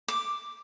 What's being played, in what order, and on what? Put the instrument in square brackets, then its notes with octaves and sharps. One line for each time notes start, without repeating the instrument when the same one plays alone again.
[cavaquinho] D6